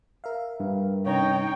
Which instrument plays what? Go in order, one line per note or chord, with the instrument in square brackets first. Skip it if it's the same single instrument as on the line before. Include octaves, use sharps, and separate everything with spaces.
[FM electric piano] A#4 E5 F5
[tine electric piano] G2
[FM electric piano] C3 C#4 A#5 [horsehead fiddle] D#4 G5 [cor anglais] C#5